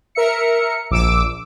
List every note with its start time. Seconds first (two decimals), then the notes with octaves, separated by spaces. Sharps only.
0.15 A#4 E5 C#7
0.91 A#1 D6 E6 D7